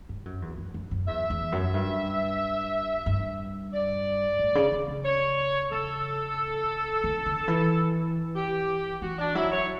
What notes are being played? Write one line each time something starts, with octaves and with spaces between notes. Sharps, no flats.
G2
F#2
E2
F#2
F#2
F#2
E2 E5
E2
F#2
G2
G2
D5
A2
C#3
C#3
C#3
C#5
C#3 A4
D3
D3
E3
G4
E3 F#4
D4
F#3 E4
C#5